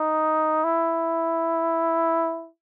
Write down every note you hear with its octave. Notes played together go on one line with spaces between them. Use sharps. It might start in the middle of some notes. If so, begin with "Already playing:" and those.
Already playing: D#4
E4